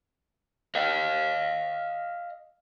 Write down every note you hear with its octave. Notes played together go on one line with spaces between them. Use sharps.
D#5 F5